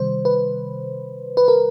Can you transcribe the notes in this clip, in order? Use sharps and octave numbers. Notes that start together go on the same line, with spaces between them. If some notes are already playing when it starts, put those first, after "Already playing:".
Already playing: C3 D#3 G3 C5
B4
B4
A#4